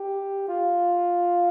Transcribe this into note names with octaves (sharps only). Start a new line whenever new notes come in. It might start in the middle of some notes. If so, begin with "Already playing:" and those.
Already playing: G4
F4